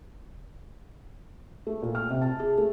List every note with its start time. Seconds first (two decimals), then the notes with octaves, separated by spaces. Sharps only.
1.67 A3
1.82 A#2
1.95 F6
2.10 C3
2.22 A5
2.40 G#4
2.58 A3